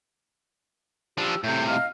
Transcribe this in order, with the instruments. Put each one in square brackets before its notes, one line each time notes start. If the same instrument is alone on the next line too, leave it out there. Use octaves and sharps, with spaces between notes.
[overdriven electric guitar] F3 D4 [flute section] G4 E6
[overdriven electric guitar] A2 C3 [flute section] A4 G6
[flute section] D#5 F5 F6